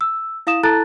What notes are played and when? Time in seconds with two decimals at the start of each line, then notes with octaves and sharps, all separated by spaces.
0.01 E6
0.47 E4 F5 D#6 E7
0.63 E4 A4 A5 A#5 F#6 A6